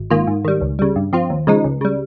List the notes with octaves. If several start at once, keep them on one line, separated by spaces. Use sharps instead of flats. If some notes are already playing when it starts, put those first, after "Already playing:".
Already playing: G#1
G#2 D#3 A#3 F4
G#2
D#3 G3
C#2
C#3 G3
G2
F3 C4 F4
D#2
C#3 F3 G#3 D#4
C#2
C#3 G3